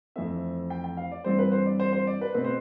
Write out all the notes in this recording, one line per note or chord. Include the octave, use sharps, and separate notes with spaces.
F2 E3 A3 C4 E5
G5
G5
F5
D5
G2 E3 G3 C4 C5
B4
C5
D5
C5
C5
D5
B4
B2 A3 C4 B4
C5